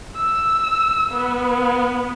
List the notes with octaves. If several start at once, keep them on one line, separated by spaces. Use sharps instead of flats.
E6
B3